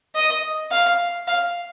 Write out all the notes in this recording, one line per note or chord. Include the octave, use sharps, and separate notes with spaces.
D#5
F5
F5